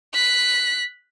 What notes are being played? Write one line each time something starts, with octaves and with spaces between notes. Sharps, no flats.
F#6 B6